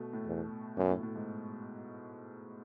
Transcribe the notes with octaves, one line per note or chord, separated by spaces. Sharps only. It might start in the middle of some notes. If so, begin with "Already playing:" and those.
Already playing: B2 A3
A2
E2
F#2 B2
A2
A2
G#2